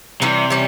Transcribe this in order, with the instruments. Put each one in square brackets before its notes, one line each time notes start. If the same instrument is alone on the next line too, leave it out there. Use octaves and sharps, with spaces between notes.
[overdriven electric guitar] C3 [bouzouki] E3 G3 C#4
[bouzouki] E3 G3 C#4